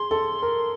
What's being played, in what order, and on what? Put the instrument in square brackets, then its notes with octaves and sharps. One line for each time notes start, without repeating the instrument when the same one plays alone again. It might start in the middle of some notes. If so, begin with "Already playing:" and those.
Already playing: [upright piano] G#4 [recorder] C6
[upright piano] A4
A#4